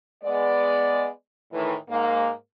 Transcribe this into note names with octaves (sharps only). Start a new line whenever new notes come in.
G#3 B3 D5
A2 D#3 E3
G#2 A#3